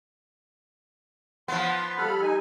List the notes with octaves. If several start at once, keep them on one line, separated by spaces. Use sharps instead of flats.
F3 B3 C6
G3 G4 A4 B5 F6
D#4 G#5